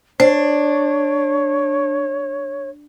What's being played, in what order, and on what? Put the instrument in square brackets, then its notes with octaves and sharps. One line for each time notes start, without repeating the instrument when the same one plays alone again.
[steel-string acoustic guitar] D4 [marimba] C5 [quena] C#5